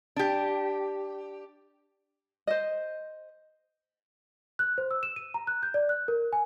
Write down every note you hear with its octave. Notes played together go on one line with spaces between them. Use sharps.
D4 G4
C5 D#5
F#6
C5
E6
E7
D#7
A#5
F#6
G6
D5
F#6
A#4
G#5